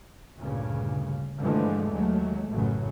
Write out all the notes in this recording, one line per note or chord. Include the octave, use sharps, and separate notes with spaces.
D2 G2 A#2 C#3
G2 D3 E3 F3 G#3 A3
D#2 F#3 G#3 A3
A1 F#2 A2 C#3 F#3